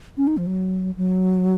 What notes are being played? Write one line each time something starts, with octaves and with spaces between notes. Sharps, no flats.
C#4
D#4
F3
F#3
F#3